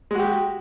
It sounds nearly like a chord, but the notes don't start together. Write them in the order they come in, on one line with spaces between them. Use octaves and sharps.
G#3 F#4 G4